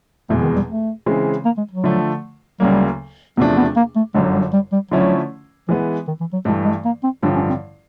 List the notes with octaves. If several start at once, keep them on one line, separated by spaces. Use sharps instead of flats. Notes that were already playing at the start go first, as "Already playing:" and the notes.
F1 E2 B2 G#3 A3
D#3
G3
A3
C#3 E3 G#3 C4
A#3
G#3
F#3
D3 F3 A3
D2 C#3 F#3 G3 A#3
E2 C3 F3 A3 B3 D4
B3
A#3
A3
G1 F#2 D3 F#3 G#3
G3
G3
G3
D3 F3 F#3 A3 C#4 E4
E3 F3 G#3 B3
D#3
E3
F#3
G2 E3 G#3 A3
G#3
A#3
C4
A1 G2 D3 F3 D4
C#4
C4